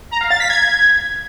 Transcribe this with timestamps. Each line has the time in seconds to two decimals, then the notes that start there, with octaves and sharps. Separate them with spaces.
0.11 A#5
0.21 F5
0.31 A6
0.40 B6
0.50 G#6